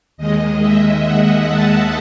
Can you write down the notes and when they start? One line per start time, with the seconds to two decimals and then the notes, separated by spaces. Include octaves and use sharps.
0.17 D#2 D#3 G#3 D#5
0.61 E5
1.03 F#5
1.47 A5